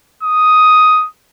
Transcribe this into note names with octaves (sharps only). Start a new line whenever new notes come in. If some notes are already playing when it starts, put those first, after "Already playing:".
D#6